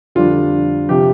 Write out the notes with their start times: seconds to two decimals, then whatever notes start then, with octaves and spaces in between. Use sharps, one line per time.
0.15 F2 D3 G3 D4 F4
0.89 C3 F3 G4